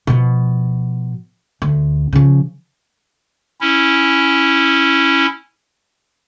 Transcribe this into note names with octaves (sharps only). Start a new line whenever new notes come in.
B2 F3
D2
C#3 F3
C#4 E4